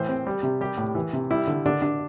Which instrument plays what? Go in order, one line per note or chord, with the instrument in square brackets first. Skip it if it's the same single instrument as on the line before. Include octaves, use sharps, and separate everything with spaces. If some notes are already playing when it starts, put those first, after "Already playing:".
Already playing: [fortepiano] A2 E3 C5
C4
G3
C3
G3 G4
A2
E3
C3
G3 E4
D3
D3 D4
D4